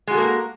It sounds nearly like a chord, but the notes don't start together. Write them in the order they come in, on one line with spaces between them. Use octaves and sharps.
G#3 F#4 A4 A#3 A#4